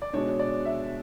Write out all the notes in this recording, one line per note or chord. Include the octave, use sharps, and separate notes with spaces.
D5
B2 G#3 D4 C#5
D5
E5